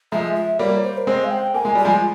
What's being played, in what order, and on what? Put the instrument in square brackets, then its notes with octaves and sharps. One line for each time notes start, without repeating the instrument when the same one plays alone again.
[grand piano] F3 G#3 [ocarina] E5
[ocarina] E5
[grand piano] G3 A#3 [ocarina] C#5
[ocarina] C5
A#4
[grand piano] G#3 C4 [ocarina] C5
[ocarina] F5
G5
[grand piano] A#3 [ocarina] G#5
[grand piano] G#3
[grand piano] G3 [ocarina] G#5
[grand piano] F3 G#3